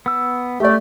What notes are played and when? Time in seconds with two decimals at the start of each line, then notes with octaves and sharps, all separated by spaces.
0.06 B3 E6
0.60 A3 G4 D5